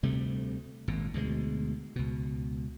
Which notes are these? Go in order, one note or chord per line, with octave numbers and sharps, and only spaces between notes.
D2 C3 G3 A3
G#1 A#2
D2 B2 D#3 G#3
C#2 B2